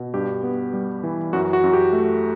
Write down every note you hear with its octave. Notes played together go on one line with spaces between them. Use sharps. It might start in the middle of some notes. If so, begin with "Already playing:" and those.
Already playing: B2
G2 G4
B3
G3
E3
F#2 F#4
F#4
F#2
G4
A3